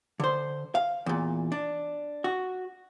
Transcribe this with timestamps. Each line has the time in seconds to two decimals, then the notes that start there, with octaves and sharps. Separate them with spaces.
0.20 D3 C5
0.75 F5
1.06 E2 A#2
1.52 D4
2.24 F#4